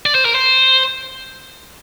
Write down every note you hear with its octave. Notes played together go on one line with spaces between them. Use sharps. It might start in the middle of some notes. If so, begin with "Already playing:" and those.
D5
C5
A#4
C5